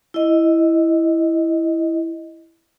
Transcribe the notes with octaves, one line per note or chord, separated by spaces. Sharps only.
E4 D#5